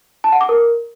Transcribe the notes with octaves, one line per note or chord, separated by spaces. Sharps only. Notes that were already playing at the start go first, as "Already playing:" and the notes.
A5
F#5
D6
A#4